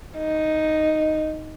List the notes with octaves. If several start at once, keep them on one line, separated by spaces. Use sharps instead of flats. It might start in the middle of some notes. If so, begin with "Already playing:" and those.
D#4